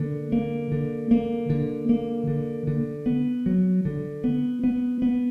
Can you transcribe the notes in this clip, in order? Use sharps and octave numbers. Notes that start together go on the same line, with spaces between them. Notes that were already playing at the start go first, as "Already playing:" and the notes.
Already playing: D3 A#3
A#3
D3
A#3
D3
A#3
D3
D3
B3
F#3
D3
B3
B3
B3